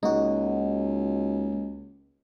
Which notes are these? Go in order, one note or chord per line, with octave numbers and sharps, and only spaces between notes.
C#2 G#3 A#3 D#4 F#4